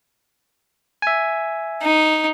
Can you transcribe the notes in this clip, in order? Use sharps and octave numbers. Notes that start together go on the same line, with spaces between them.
E5 G#5
D#4